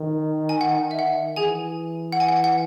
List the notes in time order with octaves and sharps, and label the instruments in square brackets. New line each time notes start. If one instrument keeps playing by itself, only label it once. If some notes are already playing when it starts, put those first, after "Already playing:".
Already playing: [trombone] D#3
[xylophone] G#5
F#5
E5
F#5
[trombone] E3 [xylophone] G#4 G#5
[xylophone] F#5
G#5
F#5
G#5
F#5